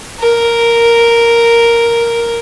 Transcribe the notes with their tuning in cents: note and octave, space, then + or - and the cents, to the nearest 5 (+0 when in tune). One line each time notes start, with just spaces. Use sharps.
A#4 +0